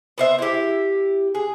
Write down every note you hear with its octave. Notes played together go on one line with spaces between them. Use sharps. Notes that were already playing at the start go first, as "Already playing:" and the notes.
B3 C5 E5
E4 G4
G#4